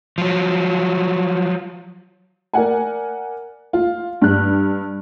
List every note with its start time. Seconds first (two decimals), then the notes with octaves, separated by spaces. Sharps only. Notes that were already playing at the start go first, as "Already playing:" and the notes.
0.18 F3 F#3
2.53 A#4 D5 F#5 G#5
3.73 F4
4.22 G2 F#6